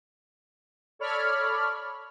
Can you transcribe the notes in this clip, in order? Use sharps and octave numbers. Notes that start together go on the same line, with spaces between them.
A4 C#5 D5 B5 F6